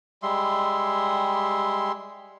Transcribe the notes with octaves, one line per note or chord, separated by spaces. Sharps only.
G3 G#3 E5 C6